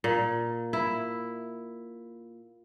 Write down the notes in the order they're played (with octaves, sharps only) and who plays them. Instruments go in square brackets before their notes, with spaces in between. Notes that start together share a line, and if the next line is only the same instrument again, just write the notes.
[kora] A#2
E4